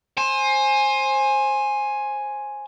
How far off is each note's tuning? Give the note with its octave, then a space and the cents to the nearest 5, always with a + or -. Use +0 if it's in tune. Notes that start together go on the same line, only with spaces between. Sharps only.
C5 +25 G#5 +0